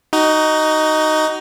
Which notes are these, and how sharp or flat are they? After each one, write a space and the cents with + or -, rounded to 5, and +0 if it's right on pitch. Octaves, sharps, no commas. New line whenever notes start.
D#4 +0 F#4 +30